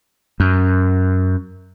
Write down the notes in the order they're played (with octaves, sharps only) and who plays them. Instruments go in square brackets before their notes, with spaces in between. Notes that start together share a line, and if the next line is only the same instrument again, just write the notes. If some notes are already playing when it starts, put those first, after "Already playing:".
[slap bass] F#2